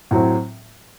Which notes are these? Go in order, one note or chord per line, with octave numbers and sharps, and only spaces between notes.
A2 F#3 C4